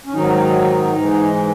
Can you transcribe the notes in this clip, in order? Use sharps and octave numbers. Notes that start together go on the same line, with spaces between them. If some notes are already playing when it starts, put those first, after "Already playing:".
C#4
G#2 D#3 F#3 D#4
G#2 E3 G#3